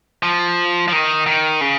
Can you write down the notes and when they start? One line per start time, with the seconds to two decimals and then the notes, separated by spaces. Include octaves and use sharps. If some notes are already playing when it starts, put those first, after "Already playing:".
0.23 F3
0.88 F3
0.92 D#3
1.26 D#3
1.61 C#3